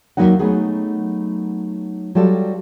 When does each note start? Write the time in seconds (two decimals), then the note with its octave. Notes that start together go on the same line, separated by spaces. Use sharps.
0.17 D#2 E3 F#3 A#3 D#4 F#5
0.39 F#3 A3 B3 D#4 G#4
2.15 F#3 G3 F4 A4